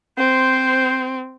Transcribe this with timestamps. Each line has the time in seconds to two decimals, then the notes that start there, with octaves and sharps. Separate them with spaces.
0.18 C4 C5